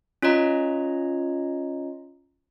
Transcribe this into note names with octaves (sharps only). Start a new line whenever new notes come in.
C#4 F4 C#5 D#5 A#5